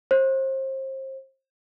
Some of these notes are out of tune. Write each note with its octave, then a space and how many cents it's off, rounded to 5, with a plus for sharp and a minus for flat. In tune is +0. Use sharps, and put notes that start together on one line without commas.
C5 +30